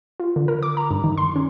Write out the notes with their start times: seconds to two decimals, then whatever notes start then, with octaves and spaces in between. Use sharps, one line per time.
0.20 F4
0.36 D3
0.48 A#4
0.63 D6
0.77 A#5
0.91 G2
1.04 D#3
1.18 C6
1.36 C#4